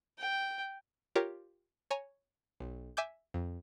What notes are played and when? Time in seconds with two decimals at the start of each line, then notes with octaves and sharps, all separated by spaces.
0.19 G5
1.16 F4 G4 A#4 C#5
1.91 C#5 G#5 A#5
2.60 B1
2.97 E5 G#5 D6 G6
3.34 F2